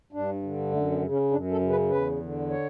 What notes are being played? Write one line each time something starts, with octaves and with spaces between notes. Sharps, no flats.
G2 D4
D3
F#2 A3
B3
C#3
C#4
F#2 D4
A4
C#3
B4
E2 B4
D3
C#5